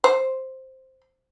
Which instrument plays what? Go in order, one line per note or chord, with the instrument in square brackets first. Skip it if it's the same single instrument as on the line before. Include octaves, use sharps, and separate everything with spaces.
[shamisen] C5